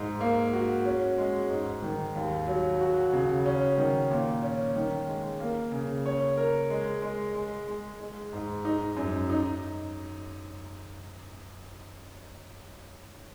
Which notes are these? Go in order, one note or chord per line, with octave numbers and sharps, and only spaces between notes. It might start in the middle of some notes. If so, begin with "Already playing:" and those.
Already playing: G#2
A#3
F#4
C#4
G#3
G#2
D#3
D#2
F#3
F#4
C#3
C#4
D#3
A#2
C#4
D#3
G#3
A#3
C#3
C#5
A#4
G#3
G#3
G#3
G#3
G#3
G#2
D#4
F#2
D#4